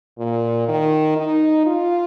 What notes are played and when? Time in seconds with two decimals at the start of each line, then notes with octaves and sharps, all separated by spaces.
0.18 A#2
0.68 D#3
1.17 D#4
1.66 F4